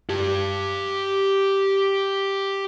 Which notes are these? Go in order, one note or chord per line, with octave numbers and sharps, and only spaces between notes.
G4 A5